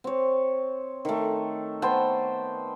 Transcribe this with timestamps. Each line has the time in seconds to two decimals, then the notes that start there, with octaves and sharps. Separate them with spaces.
0.04 C4 C#5
1.05 D#3 A3
1.82 B3 C5 G5 A5